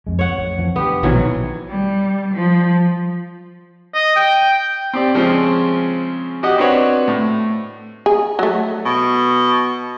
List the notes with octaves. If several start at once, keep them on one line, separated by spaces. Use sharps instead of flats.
F2 G#3
C#5 F#5
A1
F2 E3 F3
D3 B3 G4
A#1 B2 D#3 E3 F#3
G3
F3
D#5
G5
C4 G4 D5
C#3 F3 G#3 C4 C#4
F#4 G4 D#5 F#5
C4 D4 F#4 B4 C#5
A2
G#4
F#3 A3
B2